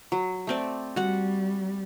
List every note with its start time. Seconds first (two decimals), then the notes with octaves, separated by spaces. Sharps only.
0.12 F#3
0.47 A3 C4 D5
0.96 G3 F#4 F#5